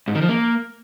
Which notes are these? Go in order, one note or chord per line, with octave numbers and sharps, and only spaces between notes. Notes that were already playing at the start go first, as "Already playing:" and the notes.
G#2
D#3
F3
A#3